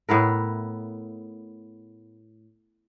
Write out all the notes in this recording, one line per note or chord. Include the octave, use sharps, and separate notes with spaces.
A2 B3 E4 A#4